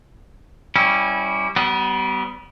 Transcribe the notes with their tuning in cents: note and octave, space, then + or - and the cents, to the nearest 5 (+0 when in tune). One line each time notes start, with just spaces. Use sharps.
G3 +0 C#4 -10 E4 -25
G3 -35 B3 +15